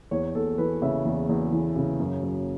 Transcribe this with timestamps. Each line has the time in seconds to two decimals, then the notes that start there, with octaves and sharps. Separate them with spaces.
0.11 E2 C#5
0.35 E2 A4
0.58 E3 B4
0.82 C#3 E5
1.05 E2
1.29 E2
1.52 E3
1.76 C#3
1.99 F#2
2.23 F#2